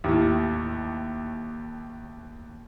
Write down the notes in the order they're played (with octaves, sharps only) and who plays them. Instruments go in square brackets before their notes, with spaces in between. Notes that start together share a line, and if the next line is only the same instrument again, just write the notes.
[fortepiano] D#2 A2